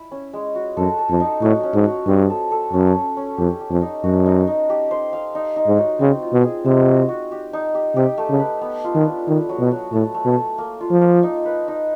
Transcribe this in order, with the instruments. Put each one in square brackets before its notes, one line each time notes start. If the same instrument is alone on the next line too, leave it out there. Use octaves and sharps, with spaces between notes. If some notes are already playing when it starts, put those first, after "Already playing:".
Already playing: [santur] E4
C#4
G#3
F#4
[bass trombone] F#2 [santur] A4
[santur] A4
[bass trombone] F2
[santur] D#4
[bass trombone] A2 [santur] F#3
[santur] C#4
[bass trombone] G#2
[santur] F#3
[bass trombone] G2 [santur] C4
[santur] A4
A4
[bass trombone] F#2 [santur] C#4
[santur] C#4
C#4
[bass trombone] F2 [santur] G4
[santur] G4
[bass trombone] F2
[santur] D#4
[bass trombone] F#2 [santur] F#4
[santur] D#4
D#4
G4
C5
F5
D#4
D#4
[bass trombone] G#2
[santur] F#3
[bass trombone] C#3 [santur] C4
[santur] F4
[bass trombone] B2
[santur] G#4
[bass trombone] C3 [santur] G#3
[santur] F#4
F#4
G4
D#4
G4
[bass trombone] C3 [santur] G4
[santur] A3
[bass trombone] C#3
[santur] B4
B3
F4
[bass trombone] D#3
[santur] D4
[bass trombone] D#3 [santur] E4
[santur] F#3
[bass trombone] B2
[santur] F#3
[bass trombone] A2 [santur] A3
[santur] A3
[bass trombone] B2
[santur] A3
A#3
F4
[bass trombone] F3
[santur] A#3
D#4
B4
D#4